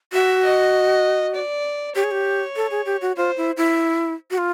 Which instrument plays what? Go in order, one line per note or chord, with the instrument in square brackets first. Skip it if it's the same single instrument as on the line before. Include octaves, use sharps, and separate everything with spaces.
[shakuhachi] F#4 [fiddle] E5
[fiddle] D#5
D5
[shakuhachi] G4 [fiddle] C#5
[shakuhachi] G#4
G4
A4
G#4
G4
F#4
[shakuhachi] F4 [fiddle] C5
[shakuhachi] E4
E4
F#4
F4